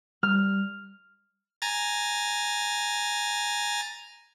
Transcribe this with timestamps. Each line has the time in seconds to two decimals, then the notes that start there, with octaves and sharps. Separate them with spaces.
0.23 G3 F6
1.62 G#5 A#5 A6